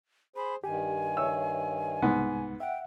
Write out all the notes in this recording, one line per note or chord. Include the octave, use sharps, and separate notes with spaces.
G#4 C5 B5
G2 D#3 G4 G#5
C#5 E5 E6
C2 G#2 G#3 B3
E5 F#5 G5